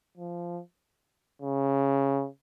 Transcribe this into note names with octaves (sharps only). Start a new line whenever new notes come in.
F3
C#3